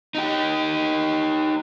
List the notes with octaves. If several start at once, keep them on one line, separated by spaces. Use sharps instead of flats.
D#4 G4